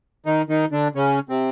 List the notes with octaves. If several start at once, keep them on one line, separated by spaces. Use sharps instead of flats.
D#3 D#4
D#3 D#4
D3 D4
C#3 C#4
C3 C4